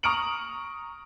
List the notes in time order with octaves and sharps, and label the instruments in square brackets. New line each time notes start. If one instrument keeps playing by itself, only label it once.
[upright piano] A#5 C#6 D#6 F6 D7 F#7